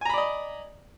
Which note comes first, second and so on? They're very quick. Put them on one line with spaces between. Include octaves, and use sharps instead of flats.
G#5 A#5 B5 D5 D#5